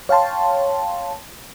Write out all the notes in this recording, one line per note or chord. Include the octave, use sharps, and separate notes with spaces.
C#5 F5 G5 A5 C6